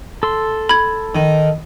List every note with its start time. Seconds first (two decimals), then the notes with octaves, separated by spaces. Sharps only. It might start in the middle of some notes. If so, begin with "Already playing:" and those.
0.23 A4 C6
0.69 B5 G#6
1.15 D#3